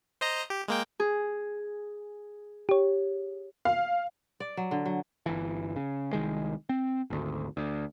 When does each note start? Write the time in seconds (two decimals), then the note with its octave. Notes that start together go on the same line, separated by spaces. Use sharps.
0.21 C5 D#5 A#5
0.50 G4
0.68 G#3 A#3 G5
1.00 G#4
2.69 G4 C#5
3.65 F5
4.40 D5
4.57 F#3
4.71 D3
4.86 F#3
5.26 G1 E3
5.76 C#3
6.13 C2 D#3 G#3
6.69 C4
7.10 G#1 D2
7.57 D2